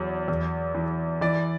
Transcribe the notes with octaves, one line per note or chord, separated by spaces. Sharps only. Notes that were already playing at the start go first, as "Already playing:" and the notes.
Already playing: E2 F#3
E2
E3
E3 D5